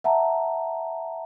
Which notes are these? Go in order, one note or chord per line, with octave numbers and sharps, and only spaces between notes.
E5 F#5 A5 A#5